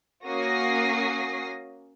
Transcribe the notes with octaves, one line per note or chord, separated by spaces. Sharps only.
A#3 C#4 F#4 D#6 A#6 C7